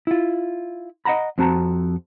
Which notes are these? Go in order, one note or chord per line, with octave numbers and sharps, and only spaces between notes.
E4 F4
D#5 F5 F#5 A#5 B5
F2 C4 F#4 A5 A#5